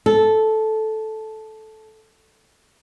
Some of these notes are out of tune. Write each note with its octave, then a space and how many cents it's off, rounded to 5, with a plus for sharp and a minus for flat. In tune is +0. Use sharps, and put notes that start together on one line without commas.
A4 -10